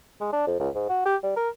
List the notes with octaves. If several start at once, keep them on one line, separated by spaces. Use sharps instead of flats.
G#3
D4
F2
C#2
G#2
F#4
G4
G3
A#4